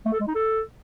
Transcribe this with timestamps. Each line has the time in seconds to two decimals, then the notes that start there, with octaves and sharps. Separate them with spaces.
0.05 A3
0.13 A4
0.20 G#3
0.27 D#4
0.35 A4